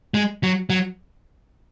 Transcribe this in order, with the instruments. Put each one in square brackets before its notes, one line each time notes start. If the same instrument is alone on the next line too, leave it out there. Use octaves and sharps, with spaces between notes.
[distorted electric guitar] G#3
F#3
F#3